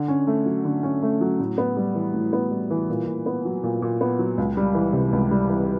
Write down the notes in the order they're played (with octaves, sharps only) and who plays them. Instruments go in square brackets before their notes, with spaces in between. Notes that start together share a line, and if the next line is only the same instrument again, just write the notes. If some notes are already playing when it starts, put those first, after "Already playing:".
Already playing: [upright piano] D3
C#4
A3
F#3
D3
C#4
A3
F#3
A2
B3
G3
E3
A2
B3
G3
E3
A#2
A#2
B3
F#3
A#2
A#2
B3
F#3
C#2
G3
E3
C3
C#2
G3
E3